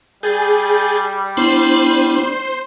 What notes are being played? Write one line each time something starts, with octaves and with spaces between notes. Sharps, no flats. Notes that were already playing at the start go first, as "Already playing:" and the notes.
G3 G#4 G6 A6
B3 D4 E4 C5 C6